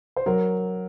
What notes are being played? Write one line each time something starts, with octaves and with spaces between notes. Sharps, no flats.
C5
F#3 A#4